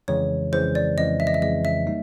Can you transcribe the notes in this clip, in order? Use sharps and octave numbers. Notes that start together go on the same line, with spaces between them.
F2 C#3 E3 G#3 C#5
F2 C#3 E3 G#3 C5
D5
F2 C#3 E3 G#3 D#5
E5
D#5
E5
F2 C#3 E3 G#3 D#5
E5
G3 A#3 D#4